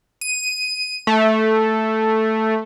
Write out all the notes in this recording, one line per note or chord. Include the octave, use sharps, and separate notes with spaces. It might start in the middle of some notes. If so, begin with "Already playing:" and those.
D#7
A3